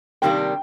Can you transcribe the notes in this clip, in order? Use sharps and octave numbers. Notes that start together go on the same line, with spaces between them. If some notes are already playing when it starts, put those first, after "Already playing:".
C3 D#3 G3 A#3 D4 G5